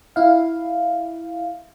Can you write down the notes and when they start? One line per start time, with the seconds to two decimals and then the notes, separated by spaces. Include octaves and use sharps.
0.16 E4 F5